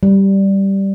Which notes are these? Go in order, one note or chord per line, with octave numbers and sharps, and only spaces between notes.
G3